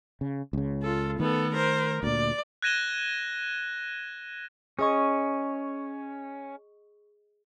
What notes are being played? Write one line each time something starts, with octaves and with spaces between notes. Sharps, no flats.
C#3
C#2 C#3
F4 A4
D#3 A3 B3 A4
A#4 C5
D2 A#2 D5
F#6 G#6 A#6 D#7 E7 G7
C#4 G#4 D#5 C#6